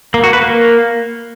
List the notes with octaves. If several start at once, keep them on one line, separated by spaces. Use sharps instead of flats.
A#3
F#4
B4
A#3